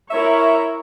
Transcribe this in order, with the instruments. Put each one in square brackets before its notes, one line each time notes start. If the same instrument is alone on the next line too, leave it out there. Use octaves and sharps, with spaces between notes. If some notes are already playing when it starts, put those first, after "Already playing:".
[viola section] E4 A#4 C#5 [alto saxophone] E5